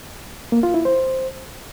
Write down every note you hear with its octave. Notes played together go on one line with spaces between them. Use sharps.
A#3
F4
E4
C5